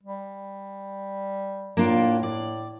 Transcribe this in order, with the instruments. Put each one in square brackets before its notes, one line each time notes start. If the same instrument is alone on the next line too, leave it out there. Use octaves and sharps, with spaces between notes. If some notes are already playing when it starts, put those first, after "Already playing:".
[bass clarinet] G3
[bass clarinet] A2 [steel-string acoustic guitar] A#3 D4 F4
[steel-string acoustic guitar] D5